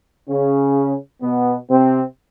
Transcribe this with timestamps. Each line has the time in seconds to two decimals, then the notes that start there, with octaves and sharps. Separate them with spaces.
0.28 C#3 C#4
1.21 B2 B3
1.69 C3 C4